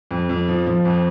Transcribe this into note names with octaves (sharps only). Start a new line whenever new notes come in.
F2
F2
F3
F3
F2